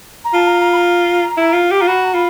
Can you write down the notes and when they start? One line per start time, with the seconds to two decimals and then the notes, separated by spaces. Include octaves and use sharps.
0.24 A#5
0.34 F4 A5
0.47 A#5
0.60 A#5
0.73 B5
0.77 A#5
1.38 E4
1.54 F4
1.71 G4
1.80 F4 A#5
1.88 F#4 B5
2.04 A#5
2.14 F4 B5